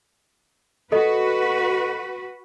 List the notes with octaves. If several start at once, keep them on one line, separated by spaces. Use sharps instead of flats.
F#4 A4 B4 D#5